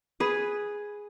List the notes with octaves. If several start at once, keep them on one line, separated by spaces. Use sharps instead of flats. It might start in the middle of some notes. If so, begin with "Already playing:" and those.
G#4 B4